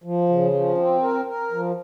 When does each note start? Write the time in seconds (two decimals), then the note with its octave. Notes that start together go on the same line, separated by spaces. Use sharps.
0.04 F3
0.29 C#3
0.53 F3
0.77 C4
1.02 A#4
1.27 A#4
1.52 F3